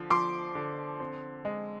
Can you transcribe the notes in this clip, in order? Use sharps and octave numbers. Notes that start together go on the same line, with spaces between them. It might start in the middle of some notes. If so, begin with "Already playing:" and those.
Already playing: D3 F3
F3 C6 D6
D3
C4
G#3